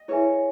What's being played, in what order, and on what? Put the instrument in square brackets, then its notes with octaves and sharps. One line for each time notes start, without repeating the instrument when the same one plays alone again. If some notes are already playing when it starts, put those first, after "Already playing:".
Already playing: [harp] D#5
[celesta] E4 G#4 B4 E5 G#5 [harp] C#5